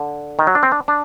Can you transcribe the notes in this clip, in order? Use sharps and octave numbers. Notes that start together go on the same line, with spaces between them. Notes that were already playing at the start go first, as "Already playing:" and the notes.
Already playing: D3
D#3
F#3
D4
C4
D4
D4